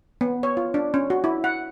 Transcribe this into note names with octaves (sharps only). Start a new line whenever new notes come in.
B3
C#5
F4
D4
C#4
F#4
E4
F#5